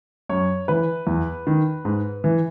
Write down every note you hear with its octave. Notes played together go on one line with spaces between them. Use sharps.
F#2 C#5
E3 B4
E2
D#3
G#2
E3